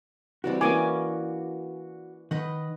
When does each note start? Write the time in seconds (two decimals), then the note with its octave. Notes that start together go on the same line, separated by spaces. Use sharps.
0.44 E3 G3 C4 F#4 D5
0.61 E3 A#3 C#4 G#5 D6
2.31 D#3 B4 D#5 F#5